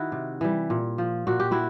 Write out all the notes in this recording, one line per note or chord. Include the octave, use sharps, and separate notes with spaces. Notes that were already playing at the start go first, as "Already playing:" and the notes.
Already playing: D#3 E4 F#4
C3
E3 G3
A#2
F3
A#2 F#4
G4
E4 F#4